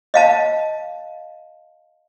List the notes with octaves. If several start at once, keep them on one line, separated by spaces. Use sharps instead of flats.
D#5 F5 A5